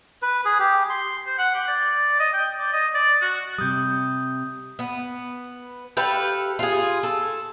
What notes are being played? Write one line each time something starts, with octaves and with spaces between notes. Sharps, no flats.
B4
G#4
G4
C6
C5
F#5
G4
D5
D#5
G5
D5
D#5
D5
F#4
C3 G3 D#6 G6
B3
G4 A4 B4 F5
F4 G#4
A4